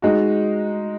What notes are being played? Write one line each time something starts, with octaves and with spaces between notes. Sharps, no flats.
G#3 D#4 F#4